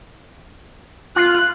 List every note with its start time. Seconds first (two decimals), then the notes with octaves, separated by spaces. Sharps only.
1.16 F4 F#6